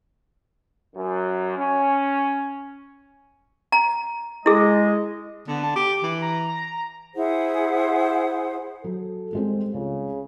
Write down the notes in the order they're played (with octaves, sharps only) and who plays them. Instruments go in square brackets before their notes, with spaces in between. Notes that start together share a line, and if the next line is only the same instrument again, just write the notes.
[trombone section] F#2
C#4
[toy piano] A#5
[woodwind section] G#3 D#5 [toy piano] E4 G#4
[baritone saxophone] D3 [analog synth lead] B3
[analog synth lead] A5
[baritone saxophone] G4 [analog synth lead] D6
[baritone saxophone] E3
[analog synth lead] A#5
[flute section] E4 G#4 C5 F#5
[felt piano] F#3 [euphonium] A4
[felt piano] G3 G#3 C4
[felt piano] C#2 [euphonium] C#3